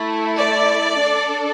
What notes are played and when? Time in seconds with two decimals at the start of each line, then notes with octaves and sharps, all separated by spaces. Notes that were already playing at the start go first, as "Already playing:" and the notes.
Already playing: A3 E4 A4
0.37 D5
0.99 D4 A4